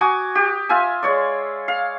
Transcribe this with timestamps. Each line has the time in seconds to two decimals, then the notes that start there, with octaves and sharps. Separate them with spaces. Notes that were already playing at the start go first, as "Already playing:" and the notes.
0.01 F#4 G#5 D6 D#6
0.35 G4
0.69 F4 E5 G#5
1.03 G#3 C#5 D5
1.68 F5